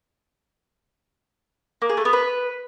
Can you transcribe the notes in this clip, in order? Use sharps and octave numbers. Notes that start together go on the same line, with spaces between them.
A#3
G#4
A3
B3
B4